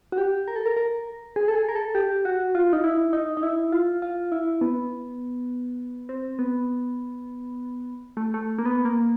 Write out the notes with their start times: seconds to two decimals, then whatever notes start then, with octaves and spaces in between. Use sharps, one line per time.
0.12 F#4
0.18 G4
0.48 A#4
0.56 A4
0.66 A#4
0.77 A#4
1.36 G#4
1.48 A4
1.55 G#4
1.69 A#4
1.76 A4
1.95 G4
2.25 F#4
2.55 F4
2.73 D#4
2.84 E4
3.13 D#4
3.37 D#4
3.43 E4
3.72 F4
4.02 F4
4.32 E4
4.61 B3
6.09 C4
6.39 B3
8.17 A3
8.34 A3
8.59 A#3
8.66 B3
8.85 A#3